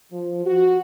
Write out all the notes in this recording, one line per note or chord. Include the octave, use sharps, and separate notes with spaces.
F3
F#4